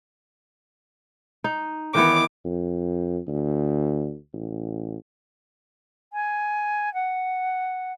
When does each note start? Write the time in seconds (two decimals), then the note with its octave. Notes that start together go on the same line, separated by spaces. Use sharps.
1.44 D#4
1.95 D#3 E3 B3 D6
2.45 F2
3.27 D2
4.33 A1
6.13 G#5
6.94 F#5